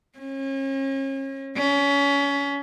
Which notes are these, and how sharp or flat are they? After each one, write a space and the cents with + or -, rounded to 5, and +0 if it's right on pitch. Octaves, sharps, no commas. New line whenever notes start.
C#4 -35
C#4 +25